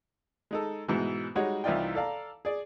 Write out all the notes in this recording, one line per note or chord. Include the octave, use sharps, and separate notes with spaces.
G#3 D#4 A4
G#2 B2 E3
G3 G#3 D#4 F#4 C#5
C2 E3 D#4 F4 D5 G5
A4 D5 F5 A#5
G#4 D5